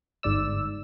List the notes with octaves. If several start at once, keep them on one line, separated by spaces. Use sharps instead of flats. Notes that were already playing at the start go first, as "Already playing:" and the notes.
G1 G#2 D5 E6